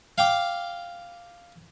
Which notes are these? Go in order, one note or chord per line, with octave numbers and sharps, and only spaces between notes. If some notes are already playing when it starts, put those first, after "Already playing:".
F5 G5 D6